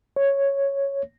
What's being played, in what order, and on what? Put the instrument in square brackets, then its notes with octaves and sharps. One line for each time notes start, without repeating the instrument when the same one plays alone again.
[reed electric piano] C#5